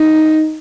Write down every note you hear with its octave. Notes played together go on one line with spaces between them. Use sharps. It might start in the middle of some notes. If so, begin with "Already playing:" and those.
Already playing: D#4